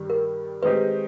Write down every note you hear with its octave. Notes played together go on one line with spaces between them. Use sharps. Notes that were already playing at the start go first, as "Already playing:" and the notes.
Already playing: G2 D#3 G3
A#4
D#3 G#3 C4 D#4 G4 B4